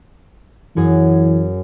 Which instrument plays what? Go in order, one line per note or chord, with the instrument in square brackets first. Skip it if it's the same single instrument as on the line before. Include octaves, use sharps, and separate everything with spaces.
[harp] F#2 F#4 G#4 [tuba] E3